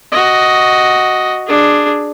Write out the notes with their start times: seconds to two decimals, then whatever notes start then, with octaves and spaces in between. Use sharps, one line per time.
0.12 F#4 D#5
1.47 D4 G#4